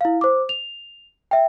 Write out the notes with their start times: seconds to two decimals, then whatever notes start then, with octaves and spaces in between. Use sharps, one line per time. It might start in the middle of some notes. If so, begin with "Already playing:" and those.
0.01 E4 F5
0.21 C5 D6
0.49 F7
1.31 E5 G5